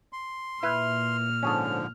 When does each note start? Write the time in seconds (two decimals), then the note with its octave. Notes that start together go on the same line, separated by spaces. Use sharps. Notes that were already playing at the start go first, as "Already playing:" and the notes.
0.13 C6
0.63 A#2 E4 B4 F6
1.43 G#2 D3 F3 C#4 G#4 A4